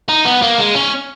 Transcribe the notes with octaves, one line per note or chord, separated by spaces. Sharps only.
D#4
B3
A#3
G#3
C#4